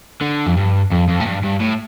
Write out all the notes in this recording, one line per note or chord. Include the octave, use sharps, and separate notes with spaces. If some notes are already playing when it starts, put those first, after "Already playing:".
D3
F2
G2
F2
F2
A2
G2
G2
A2